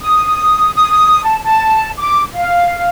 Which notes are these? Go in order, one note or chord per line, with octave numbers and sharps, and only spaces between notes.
D#6
D#6
A5
A5
D6
F5